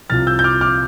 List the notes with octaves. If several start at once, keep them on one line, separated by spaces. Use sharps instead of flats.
C2 C3 F3 F6 A6
E6 G6
G6
D6 F6
D6 F6